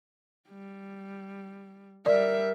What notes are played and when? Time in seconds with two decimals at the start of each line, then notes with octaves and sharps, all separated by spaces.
0.50 G3
2.06 G3 A#4 D5 E5